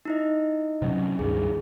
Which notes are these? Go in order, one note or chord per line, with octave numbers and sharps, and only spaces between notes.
D#4 E4 D#5
C3 F#3 C#4
C#2 G2 D#3 G#4